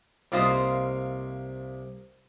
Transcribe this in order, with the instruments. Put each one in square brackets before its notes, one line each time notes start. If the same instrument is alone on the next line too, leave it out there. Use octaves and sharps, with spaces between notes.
[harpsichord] C2 [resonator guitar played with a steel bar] A#3 F4 C5 [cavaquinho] G4 D#5 D#6